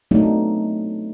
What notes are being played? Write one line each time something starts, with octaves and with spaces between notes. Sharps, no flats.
F#3 A3 B3 C4 D4 D#4